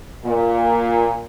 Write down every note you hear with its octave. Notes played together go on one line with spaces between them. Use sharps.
A#2